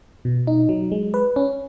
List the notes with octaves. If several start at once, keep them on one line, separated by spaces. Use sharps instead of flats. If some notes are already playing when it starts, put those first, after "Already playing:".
B2
D#4
F#3
G#3
B4
C#4